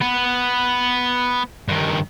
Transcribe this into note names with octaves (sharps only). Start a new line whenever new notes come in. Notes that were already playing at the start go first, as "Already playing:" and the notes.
B3
G2 D#3